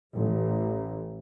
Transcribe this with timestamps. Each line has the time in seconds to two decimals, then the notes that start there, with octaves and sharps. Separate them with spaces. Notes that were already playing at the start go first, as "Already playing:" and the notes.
0.15 A1